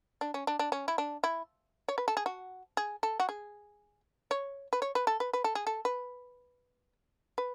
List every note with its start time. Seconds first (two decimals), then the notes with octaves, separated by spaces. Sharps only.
0.21 D4
0.34 C#4
0.47 D4
0.59 D4
0.72 C#4
0.88 E4
0.98 D4
1.24 E4
1.88 C#5
1.98 B4
2.08 A4
2.17 G#4
2.26 F#4
2.77 G#4
3.03 A4
3.20 F#4
3.29 G#4
4.31 C#5
4.73 B4
4.82 C#5
4.95 B4
5.07 A4
5.20 B4
5.33 B4
5.44 A4
5.55 G#4
5.67 A4
5.85 B4
7.38 B4